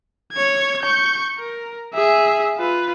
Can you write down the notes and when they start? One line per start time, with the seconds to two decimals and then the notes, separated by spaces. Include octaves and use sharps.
0.33 C#5 G#6
0.83 C#6 G6
1.38 A#4
1.94 G#4 E5
2.57 F4 B4